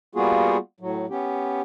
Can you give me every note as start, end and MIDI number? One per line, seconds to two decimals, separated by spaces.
0.15 0.57 55
0.15 0.57 58
0.15 0.57 59
0.15 0.57 65
0.15 0.57 66
0.15 0.57 68
0.80 1.06 45
0.80 1.06 54
1.10 1.62 59
1.10 1.62 61
1.10 1.62 67